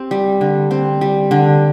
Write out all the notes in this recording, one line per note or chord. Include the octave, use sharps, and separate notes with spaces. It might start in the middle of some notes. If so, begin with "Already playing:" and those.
Already playing: C4 G4
G3
D3
C4
G3
D3